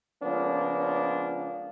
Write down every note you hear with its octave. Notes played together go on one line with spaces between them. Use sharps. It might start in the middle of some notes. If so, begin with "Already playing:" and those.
C#2 F3 A#3 B3 C#4 D4